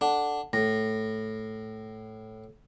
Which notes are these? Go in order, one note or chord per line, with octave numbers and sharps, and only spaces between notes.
D4 A4 F#5 A5
A2 A#6